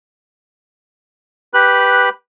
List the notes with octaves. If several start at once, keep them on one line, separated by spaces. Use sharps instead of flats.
G4 B4 F#6